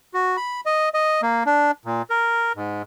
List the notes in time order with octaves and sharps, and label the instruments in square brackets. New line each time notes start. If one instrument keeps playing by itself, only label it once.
[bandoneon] F#4
B5
D#5
D#5
A#3
D4
A#2
A#4
G#2